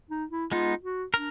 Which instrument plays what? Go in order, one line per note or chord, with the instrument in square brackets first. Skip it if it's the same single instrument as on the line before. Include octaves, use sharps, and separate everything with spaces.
[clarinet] D#4
E4
[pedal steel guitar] G#3 B3 D#4 [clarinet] F4
[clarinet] F#4
[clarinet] D4 [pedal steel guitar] A#4